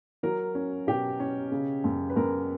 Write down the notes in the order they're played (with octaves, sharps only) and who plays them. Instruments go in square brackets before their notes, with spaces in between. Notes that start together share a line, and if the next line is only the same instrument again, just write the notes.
[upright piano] F#3 A#4
C#4
B2 G4
C#4
C#3
F#2
B4
F#2 A#4